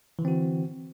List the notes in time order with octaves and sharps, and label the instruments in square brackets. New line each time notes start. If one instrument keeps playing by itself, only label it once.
[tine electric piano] E3
D3
C4
F#4